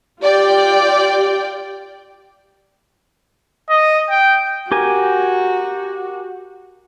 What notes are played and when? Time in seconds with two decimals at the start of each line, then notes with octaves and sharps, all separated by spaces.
0.21 F4 G4 D5 G5
3.69 D#5
4.10 G5
4.72 F#4 G4 A#4 G#5